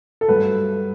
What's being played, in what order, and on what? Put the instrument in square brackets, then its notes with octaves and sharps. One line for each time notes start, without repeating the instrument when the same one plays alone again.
[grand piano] A4
G2 F#3 A3 B4